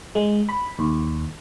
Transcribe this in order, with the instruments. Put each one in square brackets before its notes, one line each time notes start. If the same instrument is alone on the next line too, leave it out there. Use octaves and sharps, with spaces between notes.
[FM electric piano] G#3
B5
D#2